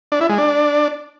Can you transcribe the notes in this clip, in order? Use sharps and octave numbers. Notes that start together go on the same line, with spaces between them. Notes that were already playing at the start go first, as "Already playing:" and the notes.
D4
E4
G#3
D4